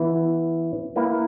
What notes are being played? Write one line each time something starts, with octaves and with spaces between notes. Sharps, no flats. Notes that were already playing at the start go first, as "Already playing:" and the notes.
Already playing: E3 B3 E4
A#3 E4 B4